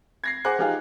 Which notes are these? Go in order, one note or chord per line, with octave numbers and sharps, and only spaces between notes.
G#6 A#6 C7
G#4 C5 F#5 D6 F#6
F3 D#4 G4 G#4 F5